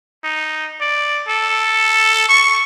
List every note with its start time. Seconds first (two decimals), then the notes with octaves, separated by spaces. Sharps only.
0.24 D#4
0.81 D5
1.28 A4
2.29 C#6